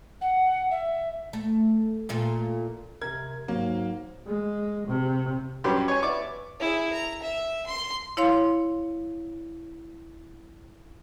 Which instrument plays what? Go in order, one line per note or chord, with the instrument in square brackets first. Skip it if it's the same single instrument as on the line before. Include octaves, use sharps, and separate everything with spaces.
[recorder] F#5
E5
[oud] A3
A#2 A3 F4
[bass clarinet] C3 [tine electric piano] A#4 [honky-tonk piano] G#6
[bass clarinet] G#2 [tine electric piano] F#3 [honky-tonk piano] A#3
[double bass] G#3
C3
[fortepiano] G2 F#3 B3 C#4 G4 C6
C#5 G#5
B3 D5 E5 C#6 D6
[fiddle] E4 G#4
A#5
E5
C6
[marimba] E4 C#5 F5 C6